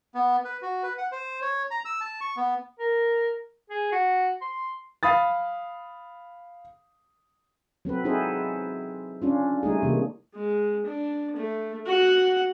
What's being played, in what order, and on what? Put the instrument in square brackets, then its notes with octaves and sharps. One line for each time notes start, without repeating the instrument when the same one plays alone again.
[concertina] B3
B4
F#4
B4
F#5
C5
C#5
A#5
E6
A5
C#6
B3
[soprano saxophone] A#4
G#4
F#4
C6
[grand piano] F5 B5 D#6 A6
[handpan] F#3 C4 A4 B4
C4 D#4 E4 G#4 A4 C5
C#4 D4 F4
G3 A3 D#4 G#4
C3 E3 A#3
[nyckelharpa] G#3
D4
A3
F#4 F#5